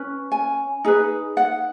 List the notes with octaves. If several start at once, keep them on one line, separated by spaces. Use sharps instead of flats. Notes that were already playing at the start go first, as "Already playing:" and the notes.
Already playing: C#4 B4
G#5
D#4 G#4 B4
F#5